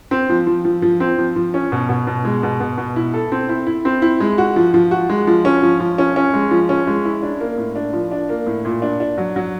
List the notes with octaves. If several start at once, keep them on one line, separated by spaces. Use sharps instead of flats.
C4
F3
F3
F3
F3
C4
F3
F3
C#4
B2
B2
B2
G#3
B2
B2
B2
E4
A4
C4
E4
E4
C4
E4
G#3
F#4
F3
F3
F#4
G#3
F3
C#4
F3
F3
C#4
C#4
G#3
F3
C#4
G#3
E4
D4
A#3
A2
D4
F3
D4
A#3
A2
A#2
D4
D4
F#3
F#3